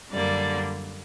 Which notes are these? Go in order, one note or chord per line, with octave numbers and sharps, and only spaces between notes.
F#2 D3 G3 A#3 D5